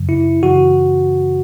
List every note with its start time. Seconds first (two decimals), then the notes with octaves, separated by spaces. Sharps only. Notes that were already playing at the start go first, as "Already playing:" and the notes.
Already playing: F#2 C#3 F#3
0.09 E4
0.42 F#2 C#3 E3 F#4